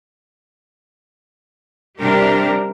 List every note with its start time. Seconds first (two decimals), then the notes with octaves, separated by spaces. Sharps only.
1.99 C3 G3 D4 G4 A#4